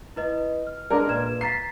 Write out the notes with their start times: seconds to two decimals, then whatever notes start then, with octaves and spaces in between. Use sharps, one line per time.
0.16 E4 B4 D#5
0.67 F6
0.90 G#3 D4 A#4 F6
1.09 A#2 B4 G#6 E7
1.41 A#5 A6 B6 C7